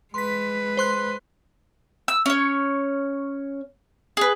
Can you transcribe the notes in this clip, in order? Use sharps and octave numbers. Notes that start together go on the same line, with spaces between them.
G#3 B4 C6 B6
C5 C6 F#6
E6
C#4 C#5
G#4 B4